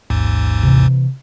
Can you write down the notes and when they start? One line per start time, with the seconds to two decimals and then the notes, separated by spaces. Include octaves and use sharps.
0.10 A1 D#2 G#2
0.63 C3 E3